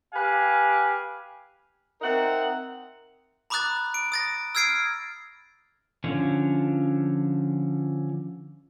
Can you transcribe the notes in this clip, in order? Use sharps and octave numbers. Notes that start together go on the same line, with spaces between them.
G4 B4 F5 G#5
C4 D#4 A#4 E5 F#5
A#5 B5 D6 D#6 F#6 A6
D7
D#6 A6 A#6
E6 F6 G#6 C7 D7
D3 F3 C#4